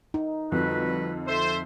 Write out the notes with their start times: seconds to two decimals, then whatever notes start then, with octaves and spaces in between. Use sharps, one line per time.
0.14 D#4
0.52 F2 D3 G3 F#4 B4
1.27 A4 C5 E5